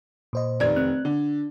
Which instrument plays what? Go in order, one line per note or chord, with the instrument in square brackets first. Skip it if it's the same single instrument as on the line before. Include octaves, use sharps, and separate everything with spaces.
[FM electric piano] A#2 C5 D#5
[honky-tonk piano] F1 D#3 G#6 [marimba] D5
[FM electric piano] C4 F#6
[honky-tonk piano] D3 [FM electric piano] D4